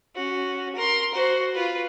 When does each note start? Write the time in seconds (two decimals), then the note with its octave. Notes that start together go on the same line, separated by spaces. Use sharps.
0.16 C#4 F#4
0.76 A#4 C6
1.14 F#4 C5
1.54 F4 B4